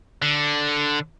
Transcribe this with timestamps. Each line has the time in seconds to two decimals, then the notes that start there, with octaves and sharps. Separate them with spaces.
0.22 D3